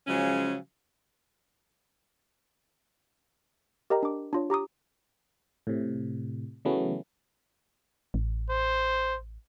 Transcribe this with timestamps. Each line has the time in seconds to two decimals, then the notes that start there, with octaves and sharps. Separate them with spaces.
0.07 C#3 F3 F#3 G#3 C#4
3.90 G4 A#4 D#5 G5 A#5
4.03 D4 D6
4.33 D4 F4 C#5
4.50 G4 A#5 D6 D#6
5.67 A2 C3
6.65 C#3 E3 F#3 A3 B3 C#4
8.14 A1
8.50 C5